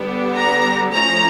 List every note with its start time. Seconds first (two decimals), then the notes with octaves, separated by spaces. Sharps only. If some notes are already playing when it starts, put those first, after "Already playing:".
Already playing: D3 G3 B3 D4
0.37 A#5
0.92 F3 A3 C#4 A#5